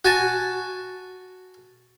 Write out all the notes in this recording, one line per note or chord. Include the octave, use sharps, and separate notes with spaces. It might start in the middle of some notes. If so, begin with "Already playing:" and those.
F#4 G#5 A5